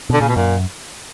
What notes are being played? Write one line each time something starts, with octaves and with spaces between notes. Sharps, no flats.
B2 D3
A#2 C#3
B2
F#2 A#2